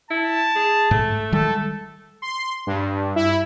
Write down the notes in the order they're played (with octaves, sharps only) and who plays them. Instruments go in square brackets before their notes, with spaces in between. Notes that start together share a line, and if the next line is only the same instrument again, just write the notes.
[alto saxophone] E4 [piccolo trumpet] A5
[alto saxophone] G#4
[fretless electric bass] G#2 [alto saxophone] A3
[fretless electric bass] D#3 G3 G#3 [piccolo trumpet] A4
[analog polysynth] C6
G2
E4